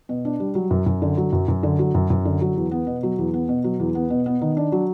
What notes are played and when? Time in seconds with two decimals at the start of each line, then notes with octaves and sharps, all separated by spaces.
0.09 B2
0.25 D4
0.40 G3
0.55 F#3
0.71 F#2
0.86 F#2
1.02 D3
1.17 F#3
1.32 F#2
1.48 F#2
1.63 D3
1.79 F#3
1.94 F#2
2.10 F#2
2.25 D3
2.41 F#3
2.56 E2
2.71 B3
2.87 B2
3.03 F#3
3.18 E2
3.34 B3
3.49 B2
3.64 F#3
3.79 E2
3.95 B3
4.10 B2
4.26 B3
4.41 D#3
4.57 D4
4.72 F#3